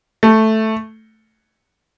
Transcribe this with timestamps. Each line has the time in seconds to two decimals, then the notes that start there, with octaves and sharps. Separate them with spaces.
0.23 A3